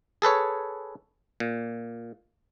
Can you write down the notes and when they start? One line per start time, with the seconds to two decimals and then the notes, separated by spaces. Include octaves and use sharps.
0.22 G#4 A4 B4 C#5
1.40 A#2